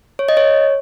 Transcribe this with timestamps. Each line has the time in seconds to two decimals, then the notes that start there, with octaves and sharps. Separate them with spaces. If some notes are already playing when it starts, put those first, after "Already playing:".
0.19 C#5
0.29 D#5
0.37 C#5